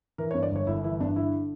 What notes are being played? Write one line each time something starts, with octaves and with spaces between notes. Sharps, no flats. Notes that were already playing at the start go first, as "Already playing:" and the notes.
E3 A#4
C#5
G2
D5
G1 C#5
G1 E4
E3 E4
G2 D4
D3 E4